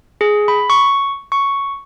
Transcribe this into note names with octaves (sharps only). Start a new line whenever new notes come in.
G#4
B5
C#6
C#6